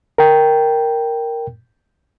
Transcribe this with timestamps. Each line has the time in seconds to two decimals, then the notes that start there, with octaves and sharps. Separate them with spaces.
0.18 A#4 G5